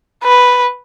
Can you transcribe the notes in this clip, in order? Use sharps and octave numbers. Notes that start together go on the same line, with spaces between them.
B4